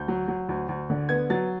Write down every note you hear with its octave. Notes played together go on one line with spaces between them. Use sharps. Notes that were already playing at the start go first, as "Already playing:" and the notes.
Already playing: D2 G6
F#3
F#3
D2
D2
D3
B3 G#6
F#3 A6